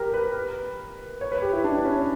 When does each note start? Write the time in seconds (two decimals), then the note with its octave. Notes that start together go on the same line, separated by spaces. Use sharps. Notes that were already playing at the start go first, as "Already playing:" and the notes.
Already playing: G4 A#4
0.14 B4
1.21 C#5
1.32 B4
1.42 G4
1.53 E4
1.64 D4
1.85 C#4